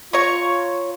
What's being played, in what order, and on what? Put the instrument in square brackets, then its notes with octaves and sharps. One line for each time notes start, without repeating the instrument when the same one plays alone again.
[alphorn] F4 [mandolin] C#5 A#5 C#6